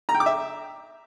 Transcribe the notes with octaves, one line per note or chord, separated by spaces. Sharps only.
A#5
G5
D6
E5